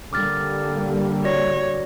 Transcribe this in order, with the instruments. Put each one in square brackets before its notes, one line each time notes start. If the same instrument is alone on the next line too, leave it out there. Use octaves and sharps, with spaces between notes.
[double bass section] D3 G3 A#3 [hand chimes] D6 F6 A6
[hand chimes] F#4 D5 A#6 [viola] C#5